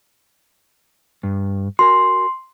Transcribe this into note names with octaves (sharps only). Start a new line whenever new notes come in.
G2
F#4 A#4 G#5 C6